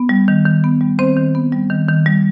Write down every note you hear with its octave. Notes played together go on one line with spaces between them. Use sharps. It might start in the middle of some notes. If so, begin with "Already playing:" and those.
Already playing: B3
G3
D#3
D#3
B3
G3
D#3 C4 C5
D#3
B3
G3
D#3
D#3
G3